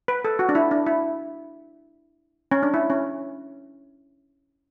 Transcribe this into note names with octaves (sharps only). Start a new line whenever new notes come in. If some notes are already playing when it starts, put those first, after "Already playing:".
B4
A4
F#4
D4
E4
D4
E4
C#4
D4
E4
C#4